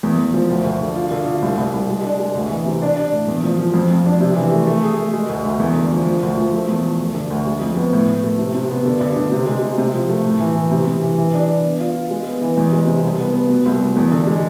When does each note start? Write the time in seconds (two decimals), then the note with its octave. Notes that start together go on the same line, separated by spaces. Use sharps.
0.03 E2
0.18 E2
0.34 F3
0.50 D2
0.64 D2
0.81 D3
0.96 F4
1.11 D3
1.26 F4
1.42 C2
1.57 C2
1.74 C2
1.89 G#3
2.04 D4
2.20 G#3
2.35 D2
2.51 E3
2.66 C3
2.82 D4
2.97 D4
3.12 A2
3.28 E2
3.44 F3
3.59 F3
3.74 F2
3.90 F2
4.06 D4
4.21 C3
4.36 E3
4.52 A3
4.67 A3
4.83 G#4
4.98 A3
5.14 G#3
5.29 D2
5.45 D2
5.60 E2
5.75 D3
5.92 F3
6.06 F3
6.23 D2
6.38 F3
6.54 A3
6.68 E2
6.85 F3
6.99 D2
7.14 D3
7.30 D2
7.46 G#3
7.61 F2
7.76 B3
7.93 A2
8.08 A2
8.24 A3
8.39 C3
8.55 C3
8.70 B3
8.85 D3
9.00 D3
9.16 D3
9.32 C3
9.47 G#3
9.62 C3
9.78 C3
9.94 F3
10.09 A3
10.25 A2
10.40 E3
10.55 E3
10.71 C3
10.87 C3
11.02 E3
11.18 E3
11.34 D4
11.48 D4
11.63 B3
11.80 F4
11.95 F4
12.10 G#3
12.27 B3
12.41 E3
12.57 E2
12.72 G#3
12.87 C3
13.04 C2
13.19 B3
13.34 B3
13.49 B2
13.66 C2
13.81 B2
13.96 E2
14.11 D3
14.27 G#3